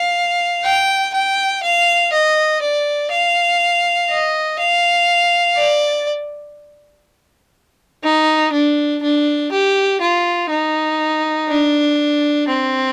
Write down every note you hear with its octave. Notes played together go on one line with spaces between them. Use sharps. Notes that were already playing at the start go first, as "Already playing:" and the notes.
Already playing: F5
G5
G5
F5
D#5
D5
F5
D#5
F5
D5
D#4
D4
D4
G4
F4
D#4
D4
C4